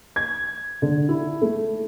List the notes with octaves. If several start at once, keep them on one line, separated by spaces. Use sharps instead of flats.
G#6
D3
E4
A3